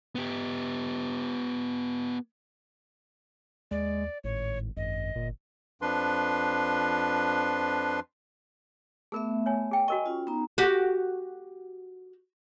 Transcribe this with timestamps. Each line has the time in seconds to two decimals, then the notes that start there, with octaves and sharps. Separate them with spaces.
0.15 B3 G4
3.71 D#2 G#3 D5
4.24 G#1 A2 C#5
4.77 G#1 F#2 D#5
5.16 G1 A#2
5.82 F2 F3 D4 B4 C6
9.12 A3 B3 G#4 A#4 E5
9.46 C#5 G#5
9.71 G#4 G5
9.88 F#4 A#4 D#5 G#5 C#6
10.06 C#4 F4
10.27 B3 D#4 A#5
10.58 F#4 G4